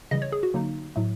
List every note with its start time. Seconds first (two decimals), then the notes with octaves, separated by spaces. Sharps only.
0.11 C#3 E3 G3 D#5
0.22 C#5
0.32 G#4
0.43 F#4
0.54 D3 F#3 A#3 D#4
0.96 A2 F#3 A3